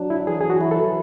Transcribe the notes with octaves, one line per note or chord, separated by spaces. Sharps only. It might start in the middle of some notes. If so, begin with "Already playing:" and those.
Already playing: F#3 D4
E4
E3 G#4
G#4
F#4
E4
A4